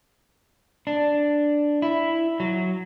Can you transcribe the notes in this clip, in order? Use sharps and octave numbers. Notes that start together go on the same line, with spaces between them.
D4
E4
F#3